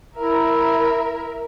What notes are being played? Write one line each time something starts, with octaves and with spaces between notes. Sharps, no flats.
E4 A#4 E5